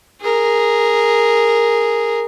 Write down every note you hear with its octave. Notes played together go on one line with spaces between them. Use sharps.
G#4 A#4